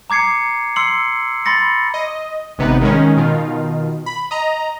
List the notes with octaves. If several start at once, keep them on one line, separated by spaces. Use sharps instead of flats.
A#5 D6 G#6 C7 C#7
C6 E6 C7 C#7 F#7
B5 C6 A6 A#6 C#7
D#5
G#1 C3 B3 D#4 B4
D#3 G#3 C#4
B2 D#3 F4
B5
D#5 A#5